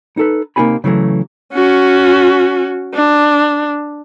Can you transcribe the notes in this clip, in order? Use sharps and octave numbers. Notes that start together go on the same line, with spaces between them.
D#4 A4 B4
C3 A#3 D#4 F4 G#5 B5
C#3 E3 F#3 A3
C#4 F#4
D4